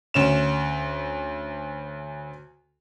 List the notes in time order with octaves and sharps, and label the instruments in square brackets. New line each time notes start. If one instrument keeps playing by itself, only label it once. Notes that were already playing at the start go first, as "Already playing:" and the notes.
[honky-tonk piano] D2 C#4 E7